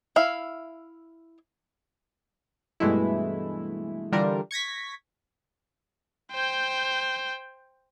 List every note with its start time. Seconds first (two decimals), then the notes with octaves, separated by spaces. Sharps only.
0.16 E4 E5 F5
2.80 G2 B2 E3 G#3 A3 E4
4.12 D3 E3 G3 D4 F4 A#4
4.51 C#6 G#6 A#6 B6
6.32 C5 G5